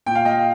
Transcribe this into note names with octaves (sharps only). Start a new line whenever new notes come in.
A#2 G5
F5
D#5 G5